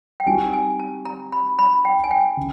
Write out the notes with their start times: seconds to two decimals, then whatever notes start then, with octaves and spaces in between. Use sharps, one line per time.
0.20 G5
0.26 G3 C4 D#4 F#4 G#5
0.53 G#5
0.80 A5
1.05 A#5
1.32 B5
1.59 B5
1.85 G5
2.04 G#5
2.11 G5
2.37 C#3